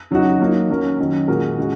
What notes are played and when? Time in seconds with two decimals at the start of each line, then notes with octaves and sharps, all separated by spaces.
0.11 C#3 F#3 D#4 F#4
0.40 F#3 A#3 D#4
0.70 F#3 C#4 A#4
0.98 D#3 F#3 C#4
1.28 A#2 G#3 F#4 A#4
1.58 C#3 G#3 F#4